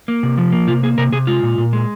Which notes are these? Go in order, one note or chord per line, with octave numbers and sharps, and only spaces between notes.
A#3
C3
F3
A#3
C3 F4
A#3 G#4
C3 A#4
C3 G#4
G#3 F4
A#2
A#2
G#3